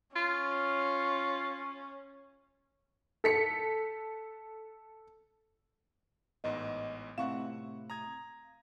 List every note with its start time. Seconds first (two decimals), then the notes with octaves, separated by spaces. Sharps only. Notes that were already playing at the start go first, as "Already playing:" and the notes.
0.16 C#4 F4
3.24 A4 B6 C#7
6.44 A1 G#2 B3 D#5
7.18 A2 C3 E4 F5 F#5 C#6 E7
7.90 A#5 D#6 G#6